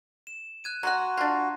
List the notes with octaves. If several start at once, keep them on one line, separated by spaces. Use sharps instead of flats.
E7
F#6 G#6 D#7
F#3 F#4 F#5 A#5 C6 F#6
D4 F4 G#6 A#6 C7